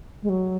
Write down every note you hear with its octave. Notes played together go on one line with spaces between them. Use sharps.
G#3
F#3